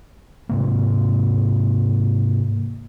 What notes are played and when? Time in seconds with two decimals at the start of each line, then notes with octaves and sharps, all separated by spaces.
0.49 G#2 C3 A#3